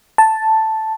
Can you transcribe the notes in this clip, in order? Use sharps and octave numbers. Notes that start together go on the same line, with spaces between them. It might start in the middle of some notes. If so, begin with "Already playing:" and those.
A5